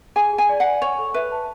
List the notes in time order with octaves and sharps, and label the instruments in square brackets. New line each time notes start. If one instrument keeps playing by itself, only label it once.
[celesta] G#4 [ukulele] G#5
[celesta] G#4
[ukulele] G#5
[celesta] D5
[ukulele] F#5
[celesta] G#5
[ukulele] C#5 [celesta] C#6
[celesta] A4
[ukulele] B4 [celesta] E5
[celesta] A5